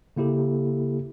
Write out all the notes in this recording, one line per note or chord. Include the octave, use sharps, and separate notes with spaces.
C#3 A#3 E4 G4 A4